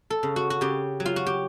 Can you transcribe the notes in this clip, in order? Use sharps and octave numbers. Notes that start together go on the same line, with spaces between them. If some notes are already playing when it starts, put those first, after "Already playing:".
A4
C#3
F#4
F#4
C#3 G4
F#3
F4
F#4
G4